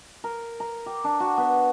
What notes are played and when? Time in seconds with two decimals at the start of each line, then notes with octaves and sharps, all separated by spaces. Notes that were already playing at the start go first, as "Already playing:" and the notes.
0.24 A#4
0.60 A#5
0.86 G4
1.04 D4
1.20 F#4
1.37 B3